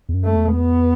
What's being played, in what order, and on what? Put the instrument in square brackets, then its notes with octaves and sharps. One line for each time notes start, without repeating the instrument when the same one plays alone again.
[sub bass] E2
F#2
[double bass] A3
[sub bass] E2
[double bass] B3